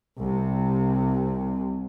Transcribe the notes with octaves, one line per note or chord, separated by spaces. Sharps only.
C2 C3